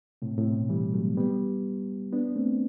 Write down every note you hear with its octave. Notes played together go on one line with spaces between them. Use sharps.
A2 C3
A2 C3
B2
E3 G3
F#3 A3
G3 B3
B3 D4
A3 C4